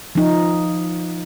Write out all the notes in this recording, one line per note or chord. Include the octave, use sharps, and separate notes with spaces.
F3 D#4